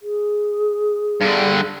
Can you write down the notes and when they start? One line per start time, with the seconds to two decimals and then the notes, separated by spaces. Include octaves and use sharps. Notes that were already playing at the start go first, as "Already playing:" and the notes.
0.02 G#4
1.21 G2 D3